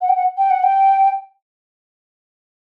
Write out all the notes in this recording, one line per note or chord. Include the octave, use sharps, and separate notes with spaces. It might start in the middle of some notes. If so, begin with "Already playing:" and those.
F#5
G5
F#5
G5
F#5
G5